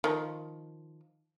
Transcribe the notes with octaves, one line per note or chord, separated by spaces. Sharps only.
D#3 F3